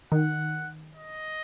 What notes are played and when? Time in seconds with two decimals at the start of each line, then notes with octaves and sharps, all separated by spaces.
0.12 D#3 F#5
0.95 D#5